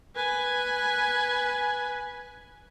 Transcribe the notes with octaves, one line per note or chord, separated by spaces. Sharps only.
B4 G#5